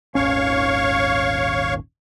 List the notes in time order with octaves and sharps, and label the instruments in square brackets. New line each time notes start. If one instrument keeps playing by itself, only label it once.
[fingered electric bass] D#1 G#1 C#4 [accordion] C#5 F5 C#6